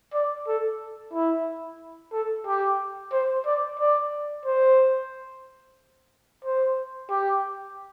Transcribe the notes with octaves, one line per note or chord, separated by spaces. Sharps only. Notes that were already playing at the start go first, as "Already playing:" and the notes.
D5
A4
E4
A4
G4
C5
D5
D5
C5
C5
G4